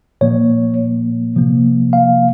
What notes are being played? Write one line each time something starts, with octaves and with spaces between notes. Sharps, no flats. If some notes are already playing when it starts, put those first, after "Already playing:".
A#2 F3 A#3 C#5
C3 F3 A#3
F5